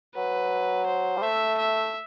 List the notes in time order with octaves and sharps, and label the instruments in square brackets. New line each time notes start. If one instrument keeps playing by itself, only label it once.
[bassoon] F#3 [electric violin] B4
[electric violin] C5
[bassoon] G3
[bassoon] A3 [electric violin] E5
[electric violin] E5